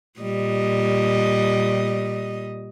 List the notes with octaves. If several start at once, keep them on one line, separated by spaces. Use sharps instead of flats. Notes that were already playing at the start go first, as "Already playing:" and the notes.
A#2 G3 D#5